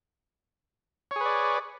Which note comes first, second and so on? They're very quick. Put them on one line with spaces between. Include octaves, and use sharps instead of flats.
C#5 G#4 B4 D5